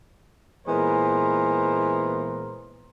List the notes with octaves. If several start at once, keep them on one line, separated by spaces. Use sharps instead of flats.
A#2 E3 G#3 B3 A#4 C5